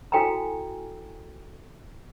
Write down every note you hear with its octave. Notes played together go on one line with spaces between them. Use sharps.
E4 F#4 A4 G5 G#5 A#5